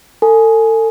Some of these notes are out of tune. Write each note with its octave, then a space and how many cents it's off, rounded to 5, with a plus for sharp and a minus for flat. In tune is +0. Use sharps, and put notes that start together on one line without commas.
A4 +35 G#5 +15